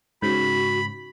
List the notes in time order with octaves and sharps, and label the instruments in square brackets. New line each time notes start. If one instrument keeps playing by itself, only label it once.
[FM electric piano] G#2 C#3 [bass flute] F#4 [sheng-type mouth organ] B5